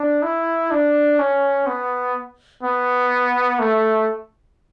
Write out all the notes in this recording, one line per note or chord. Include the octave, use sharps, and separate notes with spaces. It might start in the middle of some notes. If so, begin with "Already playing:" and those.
Already playing: D4
E4
D4
C#4
B3
B3
A3